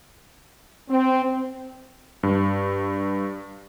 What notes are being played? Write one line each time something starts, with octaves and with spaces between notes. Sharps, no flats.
C4
G2